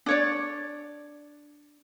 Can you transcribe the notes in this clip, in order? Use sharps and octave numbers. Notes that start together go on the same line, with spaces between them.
D4 C#5 D5